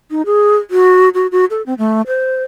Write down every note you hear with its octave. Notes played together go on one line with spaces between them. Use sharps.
D#4
G#4
F#4
F#4
F#4
A4
C4
A3
C5